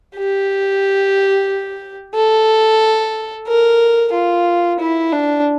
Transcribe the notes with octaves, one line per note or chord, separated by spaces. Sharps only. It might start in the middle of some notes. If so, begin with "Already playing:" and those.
G4
A4
A#4
F4
E4
D4